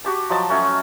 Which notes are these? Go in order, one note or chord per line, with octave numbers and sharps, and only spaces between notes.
F#4 G4 A5
F3 F#3 D#5 A5
A3 C#4 F#4 C#5